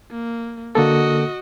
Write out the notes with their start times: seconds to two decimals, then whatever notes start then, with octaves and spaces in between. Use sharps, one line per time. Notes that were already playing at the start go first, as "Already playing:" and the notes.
0.11 A#3
0.75 D3 A#3 F#4 A4 D#5